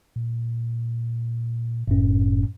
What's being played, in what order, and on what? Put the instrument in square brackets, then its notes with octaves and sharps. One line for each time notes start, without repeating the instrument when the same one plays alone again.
[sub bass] A#2
[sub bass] F#1 [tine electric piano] F#2 A2 C#4